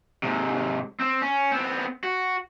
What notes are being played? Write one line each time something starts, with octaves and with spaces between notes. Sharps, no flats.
G#2 C3
C4
C#4
B3 C4
F#4